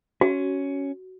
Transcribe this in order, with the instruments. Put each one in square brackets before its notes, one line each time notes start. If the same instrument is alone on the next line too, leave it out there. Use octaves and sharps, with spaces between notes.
[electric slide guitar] C#4 [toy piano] F#4